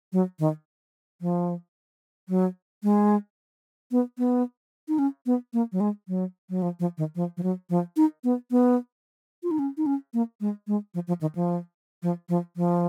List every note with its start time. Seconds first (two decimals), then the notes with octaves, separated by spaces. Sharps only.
0.13 F#3
0.39 D#3
1.21 F3
2.29 F#3
2.83 G#3
3.91 B3
4.18 B3
4.88 D#4
4.99 C#4
5.26 B3
5.53 A#3
5.72 F#3
5.80 G#3
6.08 F#3
6.50 F#3
6.62 F3
6.80 F3
6.98 D#3
7.15 F3
7.37 F3
7.43 F#3
7.70 F3
7.97 D#4
8.24 B3
8.51 B3
9.43 F4
9.51 D#4
9.59 C#4
9.77 D#4
9.86 C#4
10.14 A#3
10.41 G#3
10.67 G#3
10.94 F3
11.08 F3
11.21 D#3
11.35 F3
12.03 F3
12.29 F3
12.57 F3